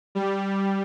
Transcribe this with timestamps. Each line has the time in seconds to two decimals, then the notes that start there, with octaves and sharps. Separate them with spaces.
0.15 G3